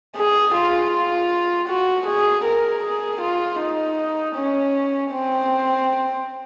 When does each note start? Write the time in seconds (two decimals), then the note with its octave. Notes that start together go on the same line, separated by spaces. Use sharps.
0.16 G#4
0.54 F4
0.92 F4
1.68 F#4
2.06 G#4
2.44 A#4
2.83 G#4
3.21 F4
3.60 D#4
4.35 C#4
5.12 C4